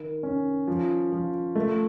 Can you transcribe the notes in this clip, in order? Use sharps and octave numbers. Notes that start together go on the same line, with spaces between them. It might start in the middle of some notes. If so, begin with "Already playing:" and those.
Already playing: D#3
C#4
F3
F3
A3